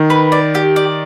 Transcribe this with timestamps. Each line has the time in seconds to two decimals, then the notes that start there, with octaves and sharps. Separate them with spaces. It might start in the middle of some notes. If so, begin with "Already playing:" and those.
Already playing: D#3
0.10 B4
0.32 D5
0.55 G4
0.76 D5